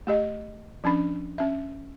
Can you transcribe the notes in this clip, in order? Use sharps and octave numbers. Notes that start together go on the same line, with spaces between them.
A3 G4 D#5
F3 C#4 D4 B5
C#4 E5